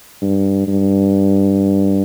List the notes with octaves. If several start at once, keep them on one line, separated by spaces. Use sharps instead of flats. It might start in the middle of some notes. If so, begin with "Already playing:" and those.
G2
G2